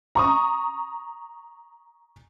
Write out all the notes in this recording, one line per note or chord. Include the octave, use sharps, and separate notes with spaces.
A#5 C#6 D#6